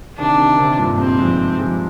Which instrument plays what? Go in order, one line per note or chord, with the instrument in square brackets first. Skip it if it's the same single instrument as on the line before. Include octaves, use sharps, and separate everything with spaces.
[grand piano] C3 D#3 [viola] D4
[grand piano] C3 D#3
C3 D#3
G2 A#2
[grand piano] G#2 C3 [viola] C4
[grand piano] F3 G#3
F3 G#3